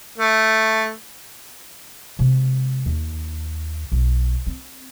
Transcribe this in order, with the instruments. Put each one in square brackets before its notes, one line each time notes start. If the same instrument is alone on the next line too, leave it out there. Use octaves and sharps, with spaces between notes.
[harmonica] A3
[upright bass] C3 G#3
D#2
B1
C4